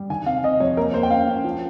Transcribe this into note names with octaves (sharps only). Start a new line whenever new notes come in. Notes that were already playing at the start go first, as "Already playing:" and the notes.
Already playing: G3
D#3 G#5
C3 F5
C3 D#5
F2 C#5
A#3 A#4
A#3 C5
G5
C#4 F5
C#4
F3